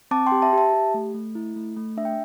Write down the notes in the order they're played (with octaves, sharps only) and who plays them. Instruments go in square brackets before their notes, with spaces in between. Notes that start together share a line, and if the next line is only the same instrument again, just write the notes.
[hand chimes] C4 A5 D6
G5 C6
G4
E5 A5
G4 E5 A5
G4
A3
A3
E4
A3
A3
D4 E5
G5